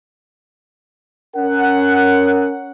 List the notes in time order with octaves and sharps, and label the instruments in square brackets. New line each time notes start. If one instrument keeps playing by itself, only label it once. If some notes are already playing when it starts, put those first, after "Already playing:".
[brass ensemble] C#4 A#4 F#5